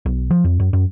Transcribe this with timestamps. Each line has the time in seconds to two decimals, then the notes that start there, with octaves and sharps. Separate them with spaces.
0.06 B1
0.31 F3
0.44 F2
0.60 F#2
0.73 F#2